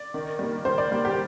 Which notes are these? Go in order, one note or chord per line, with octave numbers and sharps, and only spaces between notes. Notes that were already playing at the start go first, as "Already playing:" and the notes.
Already playing: D5
D#3
G3 A#3
D#3 C5
D5
G3 A#3
G4